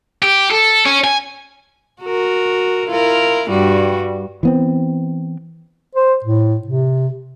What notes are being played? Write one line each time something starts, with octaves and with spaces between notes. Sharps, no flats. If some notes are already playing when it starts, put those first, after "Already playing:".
G4
A4
C#4
G#5
F#4 A#4
E4 F4 A#4
G2 G3 F#4
E3 B3 C4
C5
A2
C3